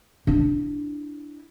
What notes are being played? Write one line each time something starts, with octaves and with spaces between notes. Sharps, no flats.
D4 E4